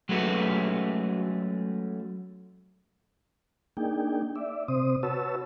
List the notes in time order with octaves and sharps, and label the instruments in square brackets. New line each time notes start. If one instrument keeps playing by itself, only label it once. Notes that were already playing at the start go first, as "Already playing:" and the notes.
[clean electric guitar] F#3 G#3 A3 C#4 F#4 B4
[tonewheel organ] A#3 D4 D#4 G#4 G5
D5 E5
C3 C4 C5 D#6
F#4 B4 C#5 A5 E6